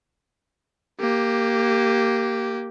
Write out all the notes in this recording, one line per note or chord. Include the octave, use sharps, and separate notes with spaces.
A#3 G4